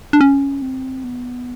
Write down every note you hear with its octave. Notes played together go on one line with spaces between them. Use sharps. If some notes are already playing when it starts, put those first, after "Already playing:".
D4
C#4
C4
B3